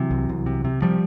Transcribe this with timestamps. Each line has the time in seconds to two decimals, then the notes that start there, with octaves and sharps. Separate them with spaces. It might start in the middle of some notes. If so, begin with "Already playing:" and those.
Already playing: C3 E3 F#3
0.11 C2
0.29 C2
0.46 C3
0.65 C3
0.82 C3 F3 G3